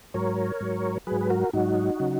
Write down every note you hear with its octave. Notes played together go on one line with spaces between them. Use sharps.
G#2 F#3 A#4 C#5
G#2 F#3
G#2 F#3 G#4 B4
B4
F#4 A#4
G#2 F#3 D#4 F#4
C#3 F#3